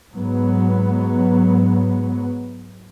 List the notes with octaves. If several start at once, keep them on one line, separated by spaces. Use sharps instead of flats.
G#2 F#3 B3